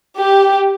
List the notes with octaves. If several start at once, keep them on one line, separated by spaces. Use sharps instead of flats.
G4